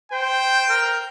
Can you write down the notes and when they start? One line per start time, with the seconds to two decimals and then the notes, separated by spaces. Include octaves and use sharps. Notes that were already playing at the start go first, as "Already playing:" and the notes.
0.12 C5 G5
0.69 A#4